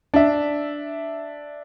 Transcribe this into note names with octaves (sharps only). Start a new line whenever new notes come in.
D4 E5